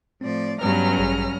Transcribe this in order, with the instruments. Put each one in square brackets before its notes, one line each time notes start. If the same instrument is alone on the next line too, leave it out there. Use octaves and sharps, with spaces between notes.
[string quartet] A2 F3 D5 [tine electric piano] C4
[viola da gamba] G2 F#3 [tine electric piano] G3 B3 B4 [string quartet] C#4 A#5 F6
[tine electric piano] A1 G#4